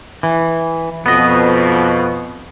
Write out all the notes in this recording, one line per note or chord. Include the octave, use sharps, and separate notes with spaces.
E3
F2 B2 B3 D#5